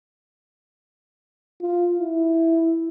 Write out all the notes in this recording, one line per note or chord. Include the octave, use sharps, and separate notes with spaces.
F4
E4